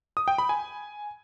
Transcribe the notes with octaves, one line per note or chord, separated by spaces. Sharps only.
D#6
G5
B5
G#5